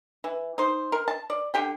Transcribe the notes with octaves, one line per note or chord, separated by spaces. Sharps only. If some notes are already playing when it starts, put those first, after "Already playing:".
E3
D#4 C5
A#4
A5
D5
D3 G4 G5